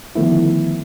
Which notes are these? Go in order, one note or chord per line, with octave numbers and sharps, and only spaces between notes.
D3 D#3 F3 A3 B3 E4